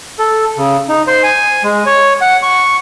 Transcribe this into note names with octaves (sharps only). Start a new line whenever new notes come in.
A4
C#3
D#4
C5
G#5
G#3
C#5
F#5
C#6